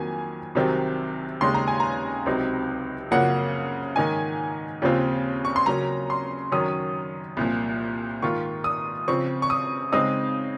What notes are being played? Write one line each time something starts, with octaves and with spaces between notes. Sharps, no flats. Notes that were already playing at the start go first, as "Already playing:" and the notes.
Already playing: F2 D#3 F#3 A#3 G#5
C2 C3 D#3 F#3 C4
D#2 C#3 G#3 D#4 C6
A#5
G#5
A#5
C#2 C3 F#3 C4 D#4
F#2 C#3 F3 A#3 F#5
G#2 D#3 A#3 D#4 G#5
D#2 C#3 F3 C4 F4
C#6
C6
C#3 F#3 A#3 C#4 A#5
C6
F#2 D#3 F#3 C#4 D#6
C2 A#2 F3
G#2 D#3 A#3 F4 C#6
D#6
C#3 F3 C4 C#6
C#6
D#6
C#3 G#3 C4 D#4 D#6